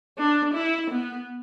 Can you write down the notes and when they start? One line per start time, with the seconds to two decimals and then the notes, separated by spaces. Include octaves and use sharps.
0.18 D4
0.54 E4
0.90 B3